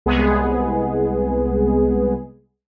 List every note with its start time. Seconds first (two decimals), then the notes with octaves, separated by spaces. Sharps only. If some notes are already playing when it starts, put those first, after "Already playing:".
0.06 C2 G#3 B3 G#4